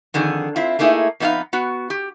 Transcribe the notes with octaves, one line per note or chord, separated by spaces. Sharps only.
F2 D3 D#3 G#4
C4 E4 F4
A3 A#3 D#4 E4 G#4
F2 B3 D#4 E4 B4 F5
B3 F#4
G4